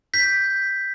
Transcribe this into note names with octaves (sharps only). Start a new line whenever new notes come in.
G6 B6
G6